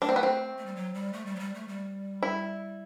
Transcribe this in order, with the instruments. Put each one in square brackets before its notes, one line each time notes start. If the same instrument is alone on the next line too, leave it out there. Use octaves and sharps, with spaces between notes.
[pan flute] A3 [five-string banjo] D4
[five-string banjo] C4
B3
C4
[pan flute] A3
G3
F#3
G3
A3
G3
F#3
G3
A3
G3
[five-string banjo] E4